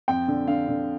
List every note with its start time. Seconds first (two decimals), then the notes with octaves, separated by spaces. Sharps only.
0.08 F2 G5
0.28 D3
0.47 D3 F5
0.68 D3